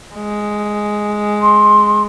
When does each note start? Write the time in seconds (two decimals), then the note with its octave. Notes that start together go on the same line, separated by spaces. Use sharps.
0.15 G#3
1.42 C6